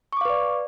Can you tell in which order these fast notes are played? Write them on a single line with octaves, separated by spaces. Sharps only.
C#6 D6 F5 B4 D5